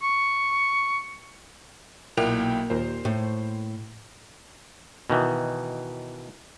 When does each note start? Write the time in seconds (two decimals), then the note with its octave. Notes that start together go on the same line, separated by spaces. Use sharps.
0.03 C#6
2.17 B1 A#2 A#3 E4 A#4 G5 F7
2.70 D#2 A#2 C5
3.05 A2
5.10 B2 D#3 E3